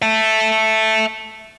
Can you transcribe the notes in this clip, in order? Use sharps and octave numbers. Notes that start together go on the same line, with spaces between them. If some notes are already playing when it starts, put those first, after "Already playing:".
E5 A5